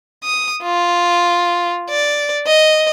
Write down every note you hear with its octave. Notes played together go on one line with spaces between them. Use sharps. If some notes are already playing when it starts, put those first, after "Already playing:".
D#6
F4
D5
D#5